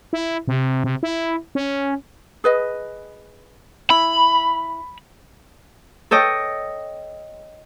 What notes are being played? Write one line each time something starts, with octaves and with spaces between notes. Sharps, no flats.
E4
C3
C3
E4
C#4
G#4 B4 D#5
E4 B5
A4 C#5 D#5 G5